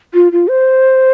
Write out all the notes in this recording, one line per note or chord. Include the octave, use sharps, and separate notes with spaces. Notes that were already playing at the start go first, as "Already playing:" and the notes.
F4
F4
C5